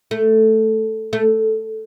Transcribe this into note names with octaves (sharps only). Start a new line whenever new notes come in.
A3
A3